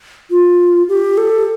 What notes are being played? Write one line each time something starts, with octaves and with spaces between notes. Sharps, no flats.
F4
G4
A4